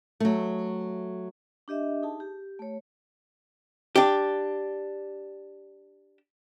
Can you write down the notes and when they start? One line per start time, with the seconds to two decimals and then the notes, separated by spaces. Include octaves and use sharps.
0.20 F#3 A3
1.68 D4 G4 D#5 E5
2.02 D#4 G#4 A5
2.20 G4
2.59 A3 C#5
3.96 D4 G4